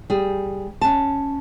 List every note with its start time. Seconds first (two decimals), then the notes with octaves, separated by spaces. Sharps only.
0.10 G3 G#4
0.81 C#4 A5